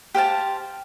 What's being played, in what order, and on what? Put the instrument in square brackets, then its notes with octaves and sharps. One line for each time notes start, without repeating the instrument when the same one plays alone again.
[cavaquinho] G4 C5 F5 A5